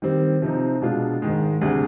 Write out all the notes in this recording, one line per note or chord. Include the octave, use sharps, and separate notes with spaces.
D#3 G3 C4
C3 F3 C4 D#4
B2 G#3 D4 F4
G#2 D#3 G#3
D2 C3 G3 D4 G#4